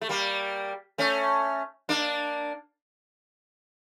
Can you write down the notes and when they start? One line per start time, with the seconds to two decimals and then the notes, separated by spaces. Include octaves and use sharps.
0.01 A3
0.09 G3 A#3
0.98 A3 C#4
1.89 A#3 D4